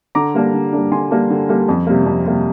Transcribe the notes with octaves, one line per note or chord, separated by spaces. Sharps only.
D3 A#5 D6
G3 A#3 D4
D3
G3 A#3 D4
D3 G#5 C6
G3 A#3 D4
D3
G3 A#3 D4
F2
C3 G3 A#3
F2
C3 G3 A#3